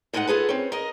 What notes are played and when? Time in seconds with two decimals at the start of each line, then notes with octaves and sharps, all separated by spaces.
0.13 G#2 G#3 A3 A#4 F#5
0.27 F4 G#4 A4 B4
0.49 C4 C#4
0.72 A#4 D#5